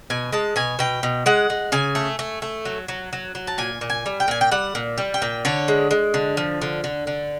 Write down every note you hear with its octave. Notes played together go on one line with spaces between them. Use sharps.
B2 G#5
G#3 A5
B2 G#5
B2 G5
B2
G#3 F#5
G#3
C#3 G#5
A3
A3
A3
F#3
F#3
F#3
F#3
A5
A#2 G#5
A#2
G#5
G3
G5
A#2 G#5
G5
G3 F#5
A#2
G3
G5
A#2
D3 C#5
G#3
G#3
D3
F3
D3
D3
D3